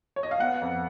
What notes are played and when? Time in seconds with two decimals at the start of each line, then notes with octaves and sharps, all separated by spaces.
0.16 C#5
0.23 D#5
0.31 F5
0.39 B3 F#5
0.62 F2